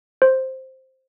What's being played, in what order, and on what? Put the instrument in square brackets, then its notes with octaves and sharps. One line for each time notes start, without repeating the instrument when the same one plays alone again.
[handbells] C5